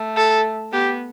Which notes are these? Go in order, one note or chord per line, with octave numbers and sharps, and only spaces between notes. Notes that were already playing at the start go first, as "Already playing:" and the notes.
Already playing: A3
A4
B3 G4